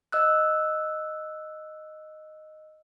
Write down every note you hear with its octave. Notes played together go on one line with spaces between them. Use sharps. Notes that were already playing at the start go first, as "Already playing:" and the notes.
D#5 E6 F#6